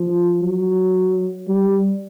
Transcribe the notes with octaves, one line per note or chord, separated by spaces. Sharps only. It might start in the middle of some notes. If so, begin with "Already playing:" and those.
Already playing: F3
F#3
G3